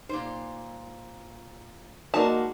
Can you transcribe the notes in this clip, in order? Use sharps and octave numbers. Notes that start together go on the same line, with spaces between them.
A#2 D#4 C5
G#3 A#3 D#4 F#4 B4 D5 A5